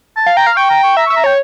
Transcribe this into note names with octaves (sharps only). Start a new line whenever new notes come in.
A5
F5
G5 A#5
F5
G5 C#6
A#5
C#6
E5 A#5
C#6
E5
A#5
C#5 G5